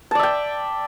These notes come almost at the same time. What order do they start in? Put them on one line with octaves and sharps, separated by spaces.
A5 D5 E5 G5